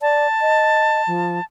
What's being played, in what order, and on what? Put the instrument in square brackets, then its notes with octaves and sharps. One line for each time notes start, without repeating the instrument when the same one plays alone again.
[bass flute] D5 [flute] A5
[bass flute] D#5
F3